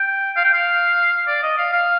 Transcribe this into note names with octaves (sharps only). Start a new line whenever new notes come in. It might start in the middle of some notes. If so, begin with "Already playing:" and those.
Already playing: G5
F5
G5
F5
D5
D#5
F5
F5